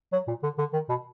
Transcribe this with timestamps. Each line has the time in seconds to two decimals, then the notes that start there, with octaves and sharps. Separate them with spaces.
0.13 F#3
0.28 A#2
0.43 D3
0.58 D3
0.73 D#3
0.89 B2